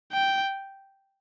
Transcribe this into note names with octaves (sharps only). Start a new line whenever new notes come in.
G5